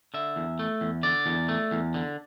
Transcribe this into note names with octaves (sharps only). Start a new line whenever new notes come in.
D3 E5
E2
A3
E2
D3 D5
E2
A3
E2
D3